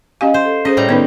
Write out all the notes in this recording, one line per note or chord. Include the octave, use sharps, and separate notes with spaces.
C#4 G4 D#5 F5 G#5
C5
A4
C#4 G#4 C5 D#5
A2 G3 A#5
D#3 B3 C#4 D#4 B4